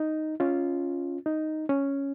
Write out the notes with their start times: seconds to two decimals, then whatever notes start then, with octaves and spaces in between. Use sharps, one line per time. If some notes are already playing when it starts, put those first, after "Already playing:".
Already playing: D#4
0.40 C#4 F4
1.26 D#4
1.69 C#4